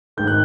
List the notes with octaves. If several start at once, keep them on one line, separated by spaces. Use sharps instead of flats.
G#1 G#2 D#3 G6
F#6